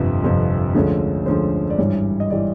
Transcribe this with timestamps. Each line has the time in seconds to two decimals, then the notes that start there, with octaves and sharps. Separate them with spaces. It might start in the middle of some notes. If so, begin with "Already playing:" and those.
Already playing: G1 F2 C3 F3 B4
0.23 G1 F2 C3 F3
0.74 D2 D3 F3 G#3 C#4
1.26 D2 D3 F3 G#3 C#4 C5
1.70 D5
1.78 G#1 G2 E3 G3 C#5
2.20 D#5
2.30 E3 G3 D5